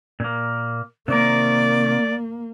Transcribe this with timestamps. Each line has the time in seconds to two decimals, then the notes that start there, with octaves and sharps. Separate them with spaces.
0.20 A#2 A#3
1.08 C3 D#3 A#3 A#4 D5